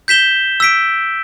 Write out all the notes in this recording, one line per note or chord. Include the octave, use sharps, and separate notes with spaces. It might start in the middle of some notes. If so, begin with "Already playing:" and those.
G6 B6 E7 G7
E6 B6 D7